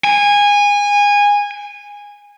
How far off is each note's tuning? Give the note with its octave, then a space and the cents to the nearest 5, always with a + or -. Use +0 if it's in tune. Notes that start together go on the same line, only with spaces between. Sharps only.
G#5 -20